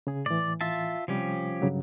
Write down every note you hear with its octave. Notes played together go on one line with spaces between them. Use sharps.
C#3 G#4
A2 E3 D5
F4 E5 A5
C3 F3 G3 C#4 G4
G2 C#3 F#3